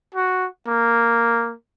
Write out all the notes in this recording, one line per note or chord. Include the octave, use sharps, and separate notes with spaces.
F#4
A#3